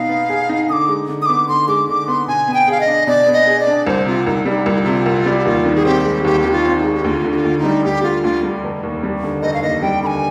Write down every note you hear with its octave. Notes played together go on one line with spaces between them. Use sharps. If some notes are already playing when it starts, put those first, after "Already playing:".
Already playing: B2 D#4 F5
B3
G#4
D#4
D3 D6 D#6
G#3
D3
D#6
B3 D6
D3 C6
G#3 D6
D3 D6
B3 C6
B2 G#5
B3
G5
G#4 F5
D#5
D4
B2 D5
B3
D#5
G#4
D5
D4
C2 C5
C3 F4
C2 D#4
G3 D#4
C2 F4
D#4
C3 F4
C2
G3
G4
D#2 F4
D#3
G#4
C4 G4
G#3
D#2 G4
D#3 G4
F4
C4
D#4
G#3
G4
D2 F4 G4
D3
G4
F4
D2
D#4
G3
D2 G4
D3 F4
D2 F4
G3
F1
D#2
G3
D3
F1 D#5
F5
D#2 D#5
G3 G5
D3 G#5 B5